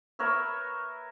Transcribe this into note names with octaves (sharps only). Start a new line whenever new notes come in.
A#4 B4 C#5 E5